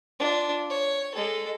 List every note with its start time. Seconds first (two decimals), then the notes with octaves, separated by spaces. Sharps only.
0.20 D4 F4
0.70 C#5
1.15 G#3 A4